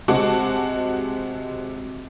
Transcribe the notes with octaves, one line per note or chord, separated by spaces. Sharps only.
C3 G#3 F#4 A5 D6